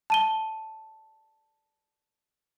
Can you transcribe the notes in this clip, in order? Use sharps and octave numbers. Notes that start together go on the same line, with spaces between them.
A5 D#7 G7